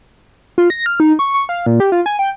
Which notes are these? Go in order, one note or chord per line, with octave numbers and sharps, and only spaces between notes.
F4
A#6
F6
D#4
C#6
C#6
F5
A#2
G4
F4
G#5
G5